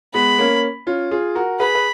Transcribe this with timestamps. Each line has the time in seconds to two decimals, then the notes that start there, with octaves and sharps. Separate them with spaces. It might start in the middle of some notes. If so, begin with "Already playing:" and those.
0.14 G#3 B3 B5
0.38 A#3 C#4
0.87 C#4 F4
1.11 F4 G#4
1.35 F#4 A#4
1.59 G#4 B4 B5
1.75 B4